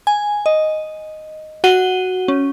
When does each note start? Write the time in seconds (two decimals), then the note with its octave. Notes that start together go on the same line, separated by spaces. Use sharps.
0.07 G#5
0.46 D#5
1.64 F#4 F#5 D#7 G7
2.28 C#4